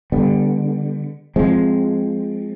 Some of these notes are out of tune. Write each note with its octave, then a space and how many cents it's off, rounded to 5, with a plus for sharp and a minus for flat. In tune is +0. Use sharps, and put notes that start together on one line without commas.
D3 +0 G3 +25 B3 +0
F3 +0 G#3 +0 C4 +0